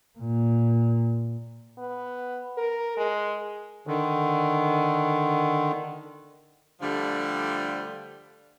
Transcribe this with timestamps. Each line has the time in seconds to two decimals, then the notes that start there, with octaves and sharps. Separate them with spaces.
0.18 A#2
1.78 B3
2.58 A#4
2.97 G#3
3.87 D3 D#3
6.81 D3 F3 G3 A3